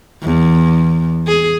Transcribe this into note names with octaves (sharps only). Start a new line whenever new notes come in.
E2
G#4